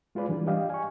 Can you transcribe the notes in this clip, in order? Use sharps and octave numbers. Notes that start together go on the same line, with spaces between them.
G#3 F4 G#4 B4 D5
E3 G3 D4
G4 D5 D#5 F5 G5
G#5 C#6